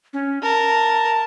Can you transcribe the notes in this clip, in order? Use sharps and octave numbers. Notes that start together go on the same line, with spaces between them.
C#4
A#4 A5